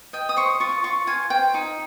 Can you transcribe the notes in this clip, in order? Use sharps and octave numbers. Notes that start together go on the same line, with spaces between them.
D#5 G5
D#6
C5 C#6
F4 C#6
F4 C#6
F4 G#5
C5 G5
D#4